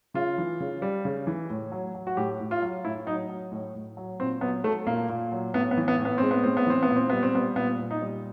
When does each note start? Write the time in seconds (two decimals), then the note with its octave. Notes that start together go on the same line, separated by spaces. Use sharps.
0.14 C#3 F4
0.38 E3
0.60 C#3
0.82 G3
1.05 C#3
1.27 E3
1.50 A2
1.72 F#3
1.95 F#3
2.07 F#4
2.17 A2 G4
2.40 A2
2.51 F4
2.62 F#3
2.85 A2 E4
3.06 F#3 D#4
3.29 F#3
3.52 A2
3.75 A2
3.97 F#3
4.20 A#2 C4
4.41 F#3 B3
4.64 F#3 A3
4.87 A#2 A#3
5.09 A#2
5.32 F#3
5.54 A2 B3
5.71 B3
5.77 E3
5.88 B3
5.99 A2
6.05 B3
6.18 G#3 C4
6.31 B3
6.44 A2 C4
6.57 B3
6.67 E3 C4
6.83 B3
6.89 A#2
6.96 C4
7.10 G3 B3
7.23 C4
7.34 G3 B3
7.56 A#2 B3
7.79 A#2
7.91 D#4
8.02 G3